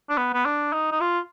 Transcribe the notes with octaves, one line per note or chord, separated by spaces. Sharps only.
D4
B3
B3
D4
D#4
D#4
F4